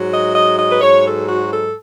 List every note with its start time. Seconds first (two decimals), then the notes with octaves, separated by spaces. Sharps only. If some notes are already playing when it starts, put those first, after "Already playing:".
Already playing: G#2 F#3
0.12 D#5
0.35 D#5
0.58 D#5
0.71 B4
0.81 G#2 F#3 C#5
1.04 A4
1.27 F#4
1.50 A4